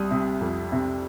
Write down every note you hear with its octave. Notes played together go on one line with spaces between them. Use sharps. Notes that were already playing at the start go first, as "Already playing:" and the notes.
Already playing: C2 G3 D#6
C3
F2
C3